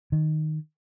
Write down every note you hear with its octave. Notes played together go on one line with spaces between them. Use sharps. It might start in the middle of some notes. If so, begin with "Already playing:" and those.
D#3